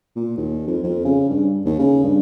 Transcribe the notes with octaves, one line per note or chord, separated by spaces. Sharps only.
A#2
D#2
F2
F2
C#3
G2
D#2
C#3
G2